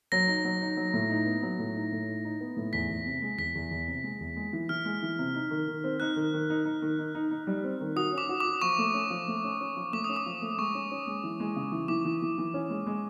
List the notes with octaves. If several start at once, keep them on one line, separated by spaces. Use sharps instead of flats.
F#3 A#6
D#4
F#3
D#4
F#3
A2
D#4
B3
F#3
A2
D#4
A2
D#4
D#4
B3
A2
E2 B6
E2
C3
G#3
E2 B6
E2
E2
C3
G#3
E2
G#3
E3
E3 F6
G#3
E3
C3
D#4
D#3
D#3
C4
D#4 F#6
D#3
D#3
D#4
D#4
D#3
D#4
D#4
D#4
G3
C4
D#3
F#4 D#6
C#4
D6
F#4
F#4 D6
F3 C#6
A3
C#4
F3
A3
C#4
C#4
F3
A3 D6
C#4 D#6
D6
F3
A3
G#3 C#6
C#4
C#4
G#3
E3
G#3
C#3
E3
E3 D6
E3
E3
E3
C#4
G#3
G#3